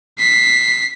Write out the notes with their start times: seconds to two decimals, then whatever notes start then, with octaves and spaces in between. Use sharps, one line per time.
0.19 B6 C7